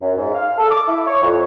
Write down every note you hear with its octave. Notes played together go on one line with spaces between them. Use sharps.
F#2
G#2
F5
A4
D6
E4
C#5
F2